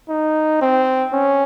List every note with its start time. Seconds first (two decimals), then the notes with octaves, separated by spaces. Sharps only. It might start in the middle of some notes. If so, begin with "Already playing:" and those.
0.10 D#4
0.62 C4
1.13 C#4